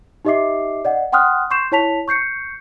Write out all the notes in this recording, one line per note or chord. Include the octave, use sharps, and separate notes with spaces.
D#4 G4 D#5 E5 D6 C7
D5 D#5 F#5
F#5 G5 C6 D#6 F6 F#6
C6 C#6 G6 C7 E7
E4 C#5 A5 B6 F7
C#6 G6 C7 C#7